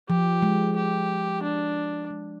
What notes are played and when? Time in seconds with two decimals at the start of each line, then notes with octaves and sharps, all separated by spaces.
0.09 F3 G4
0.42 G#3
0.76 G4
1.43 D4
2.10 G#3